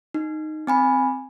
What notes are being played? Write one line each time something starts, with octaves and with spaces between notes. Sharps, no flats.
D#4
C4 G#5 B5